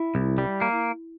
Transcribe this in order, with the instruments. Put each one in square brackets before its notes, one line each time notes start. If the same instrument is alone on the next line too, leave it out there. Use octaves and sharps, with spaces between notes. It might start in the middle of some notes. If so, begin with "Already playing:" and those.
Already playing: [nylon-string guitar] E4
[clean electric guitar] C2
G3
A#3